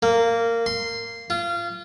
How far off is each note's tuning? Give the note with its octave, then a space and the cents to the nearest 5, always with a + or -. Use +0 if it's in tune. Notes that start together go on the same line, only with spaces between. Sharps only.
A#3 -15
C6 -10
F4 -25